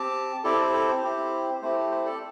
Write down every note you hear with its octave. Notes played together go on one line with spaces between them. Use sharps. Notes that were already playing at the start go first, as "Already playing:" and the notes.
Already playing: C4 G4 A5 D6
C4 E4 G4 A4 D5
C5
A4
C5
C4 E4 G4
A3 C4 E4 G4 C5
C5
A4 D5